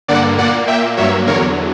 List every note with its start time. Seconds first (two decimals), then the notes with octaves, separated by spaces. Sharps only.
0.08 G2 D3 A#3 D5 F#5
0.38 A#2 A#3 D5 F#5
0.67 A#2 A#3 E5 G5
0.97 G2 F#3 A#3 C#5 E5
1.27 E2 D3 F#3 A#4 C#5